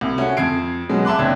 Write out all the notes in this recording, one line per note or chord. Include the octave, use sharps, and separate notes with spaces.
C2
A3 C#4 F#4 G#5
F2 G#6 C7 D7
B2 F#3 G#3
E5 A5 C6 D6 F#6
F#1 B1 C4 D4 G#6